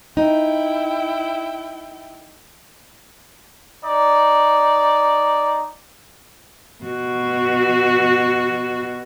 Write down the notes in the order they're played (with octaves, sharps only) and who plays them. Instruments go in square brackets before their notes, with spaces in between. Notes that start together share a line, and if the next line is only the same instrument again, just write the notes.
[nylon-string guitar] D#4 [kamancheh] E4 G5
[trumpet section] D#4 D5
[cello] B2 F#4